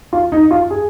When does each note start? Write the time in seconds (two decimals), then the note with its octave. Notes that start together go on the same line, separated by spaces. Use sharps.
0.13 F4
0.32 D#4
0.51 F4
0.70 G#4